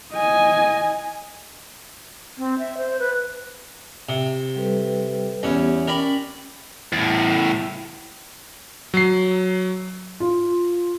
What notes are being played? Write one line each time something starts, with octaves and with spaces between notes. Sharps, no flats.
D#5 G#5
C4
E5
C5
B4
C3
G3 A4 B4
E2 B3 C#4 G4
C#4 A#4 D5 G5 B5
E2 A2
F#3 C7
F4